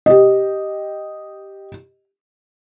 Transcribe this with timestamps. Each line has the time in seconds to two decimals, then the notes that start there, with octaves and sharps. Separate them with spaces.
0.06 G4 D#5